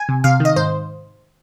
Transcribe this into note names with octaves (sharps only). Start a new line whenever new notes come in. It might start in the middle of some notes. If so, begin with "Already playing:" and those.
Already playing: G#5
C3
C3 F5
D#3
D#5
G#2 C5